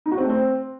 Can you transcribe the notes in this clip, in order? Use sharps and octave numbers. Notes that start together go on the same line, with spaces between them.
D#4
F#4
C4
A3
C4